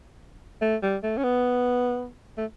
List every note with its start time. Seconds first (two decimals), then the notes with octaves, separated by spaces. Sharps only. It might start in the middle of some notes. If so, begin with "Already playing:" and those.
0.61 A3
0.82 G3
1.03 A3
1.17 C#4
1.23 B3
2.37 A3